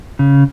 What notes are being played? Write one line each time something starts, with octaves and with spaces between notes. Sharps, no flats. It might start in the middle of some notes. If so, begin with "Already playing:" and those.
C#3